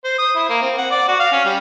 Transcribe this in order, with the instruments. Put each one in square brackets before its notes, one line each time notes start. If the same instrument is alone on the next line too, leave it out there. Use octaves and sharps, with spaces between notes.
[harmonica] C5
D#6
E4
A#3
C4
F#5
D5
F#4
F5
C#4
G3